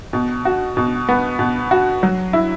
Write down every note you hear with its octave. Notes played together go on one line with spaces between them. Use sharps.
B2
F#4
B2
B3
B2
F#4
F#3
E4